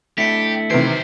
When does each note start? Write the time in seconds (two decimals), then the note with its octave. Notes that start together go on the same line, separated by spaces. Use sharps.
0.18 A3 D4 E4 G4 B6 C#7
0.70 B1 C3 D#3 E3 C5 D7